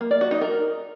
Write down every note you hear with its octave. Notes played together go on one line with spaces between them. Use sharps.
A#3
D5
F#4
D#4
A#4